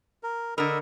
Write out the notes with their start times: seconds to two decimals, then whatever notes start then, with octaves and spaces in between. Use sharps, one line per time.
0.23 A#4
0.58 D3 A#4 D#5 B5 E6